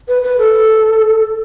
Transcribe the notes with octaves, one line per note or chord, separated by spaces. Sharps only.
B4
B4
A4